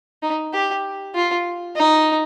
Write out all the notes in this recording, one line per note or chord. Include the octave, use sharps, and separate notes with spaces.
D#4
G4
F4
D#4